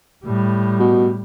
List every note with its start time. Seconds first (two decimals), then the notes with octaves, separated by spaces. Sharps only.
0.25 A2 G3
0.79 B2